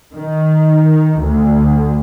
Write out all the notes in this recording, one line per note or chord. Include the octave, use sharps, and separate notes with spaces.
D#3
D2